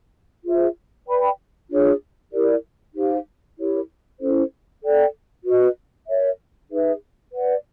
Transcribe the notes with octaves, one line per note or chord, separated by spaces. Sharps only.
F4 G#4 C5 E5
B4 D5 G5 B5
D4 F4 G#4 C#5
E4 G4 A#4 D5
D#4 G4 C5 F5
E4 G4 A#4 C#5
C#4 E4 A4 C5
A4 D5 G5
F#4 B4 D#5
A#4 C#5 E5
D#4 G#4 B4 E5
B4 D5 F#5